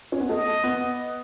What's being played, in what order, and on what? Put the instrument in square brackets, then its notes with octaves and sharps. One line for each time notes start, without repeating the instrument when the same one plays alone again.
[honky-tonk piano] C#4
B3
[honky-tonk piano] A3 [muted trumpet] D#5
[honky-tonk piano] B3